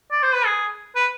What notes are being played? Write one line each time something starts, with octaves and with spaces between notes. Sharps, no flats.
D5
C5
B4
G#4
B4